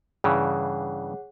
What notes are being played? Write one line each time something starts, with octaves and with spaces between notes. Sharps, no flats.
G2 C#3 E3 G#4 C#5 F#5